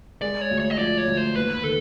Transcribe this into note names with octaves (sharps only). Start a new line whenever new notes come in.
G#3 D5
C#5
D2
C#5
D#5
F3 D5
C#5
D2
C5
D#2 B4
D#3 A4